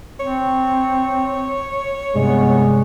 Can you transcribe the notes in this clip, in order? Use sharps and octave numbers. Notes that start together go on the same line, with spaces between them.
C4 C#5
G2 C3 G#3 B3 D5